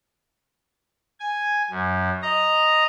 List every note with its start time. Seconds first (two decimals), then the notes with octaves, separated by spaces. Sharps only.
1.20 G#5
1.70 F#2
2.22 D#5 A#5